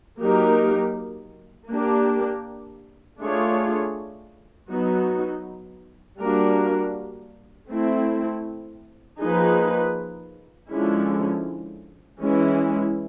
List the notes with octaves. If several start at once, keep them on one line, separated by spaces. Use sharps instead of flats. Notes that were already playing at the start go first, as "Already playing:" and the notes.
F#3 A#3 D#4 G4 A#4
A#3 D4 G4
A3 D4 F4 G#4 C#5
F#3 B3 D#4 F#4
G3 A#3 D4 F#4 A#4
A3 C4 E4
F3 A#3 D#4 G#4 B4
D3 F3 G#3 C#4 E4
E3 G#3 C#4 E4